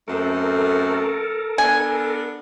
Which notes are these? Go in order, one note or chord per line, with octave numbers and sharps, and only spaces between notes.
F#2 A3 C4 A4 A#4
B3 D4 G#5